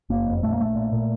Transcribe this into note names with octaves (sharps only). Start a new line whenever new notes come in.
F#1 A#3
F2
A#1 A3
A#3
A#1 A3
A#2
A#2